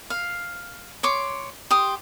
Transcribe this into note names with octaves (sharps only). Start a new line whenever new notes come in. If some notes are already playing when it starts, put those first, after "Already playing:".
F5
C#5 C6 D6
G4 C6 D#6